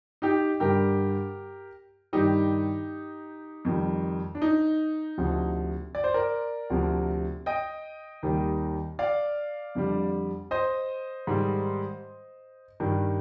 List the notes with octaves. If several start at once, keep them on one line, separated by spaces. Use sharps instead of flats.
D#4 G4
G2 D3 G3 G4 A#4
G2 D#3 G3 D#4 G4
F2 D#3 G3
D4
D#4
D2 C3 F3
D5
C5
A#4 D5
D2 C3 F3
D#5 G5
D#2 D#3 G3
D5 F5
F2 D3 G3
C5 D#5
G#2 D#3 G3
G2 D#3 G3